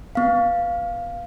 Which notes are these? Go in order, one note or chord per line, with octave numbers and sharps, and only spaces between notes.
B3 F5